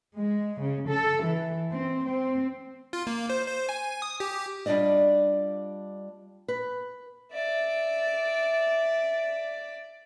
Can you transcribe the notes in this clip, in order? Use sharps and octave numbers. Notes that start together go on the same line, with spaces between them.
G#3
C#3
A4
E3
C4
C4
F4
A#3
C5
C5
G#5
D#6
G4
G3 D4 F4 D5 D#5
B4
D5 E5